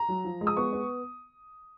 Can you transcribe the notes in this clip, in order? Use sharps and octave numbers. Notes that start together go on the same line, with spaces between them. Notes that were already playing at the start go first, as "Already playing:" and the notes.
Already playing: A#5
F#3
F3
G#3
D#6
B3 C#6
B3